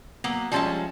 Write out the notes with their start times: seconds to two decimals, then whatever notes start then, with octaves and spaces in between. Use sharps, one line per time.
0.24 F#3 A#3 B3
0.52 F3 G3 G#3 C#4 E5 A5